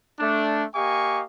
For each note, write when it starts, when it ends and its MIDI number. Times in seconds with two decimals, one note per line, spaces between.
0.19 0.64 57
0.19 0.64 62
0.75 1.22 58
0.75 1.22 67
0.75 1.22 75
0.75 1.22 77
0.75 1.22 80
0.75 1.22 85